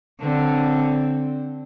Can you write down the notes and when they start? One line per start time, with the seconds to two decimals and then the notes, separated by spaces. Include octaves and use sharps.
0.22 D3 C4